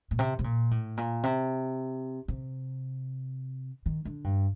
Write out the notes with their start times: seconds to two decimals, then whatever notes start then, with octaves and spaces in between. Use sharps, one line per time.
0.11 A#2
0.19 C3
0.39 C3
0.44 A#2
0.71 A2
0.97 A#2
1.23 C3
2.28 C3
3.86 D#3
4.05 D3
4.24 G2